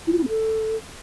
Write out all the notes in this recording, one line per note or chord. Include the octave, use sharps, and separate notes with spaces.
E4
F4
E4
C4
A4